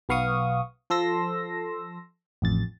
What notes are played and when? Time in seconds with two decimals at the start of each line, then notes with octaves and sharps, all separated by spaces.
0.09 B1 B3 F5 C#6 D#6
0.90 F3 A4 C6 E6 A#6
2.42 A1 F2 A6